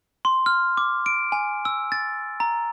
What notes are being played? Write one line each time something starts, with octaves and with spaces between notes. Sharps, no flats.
C6
F6
D6
D7
G#5
E6
A6
A#5